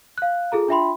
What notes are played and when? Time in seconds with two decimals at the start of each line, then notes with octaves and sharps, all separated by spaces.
0.18 F5 F#6
0.52 F4 G#4 A4 A#5
0.68 D4 F4 E5 G5 B5 C6